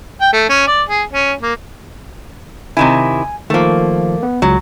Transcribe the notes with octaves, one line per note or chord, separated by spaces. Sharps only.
G5
A3
C#4
D5
G#4
C#4
A#3
C3 D#3 E4 G#5
D#3 F3 A3 A#3
B3
C#2 F#3